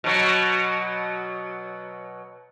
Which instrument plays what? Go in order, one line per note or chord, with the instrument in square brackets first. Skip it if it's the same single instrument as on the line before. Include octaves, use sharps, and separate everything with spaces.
[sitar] B2 F#3